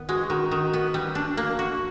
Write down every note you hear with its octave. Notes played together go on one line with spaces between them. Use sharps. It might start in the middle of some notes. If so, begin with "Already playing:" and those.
Already playing: D#3 B3
G#3 F#4
D#3 F#4
D#3
B3
G3
D4
A#3
F#4